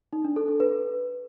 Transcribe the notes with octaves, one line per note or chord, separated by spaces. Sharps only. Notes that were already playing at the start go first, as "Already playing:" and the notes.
D#4
D4
A4
A4
B4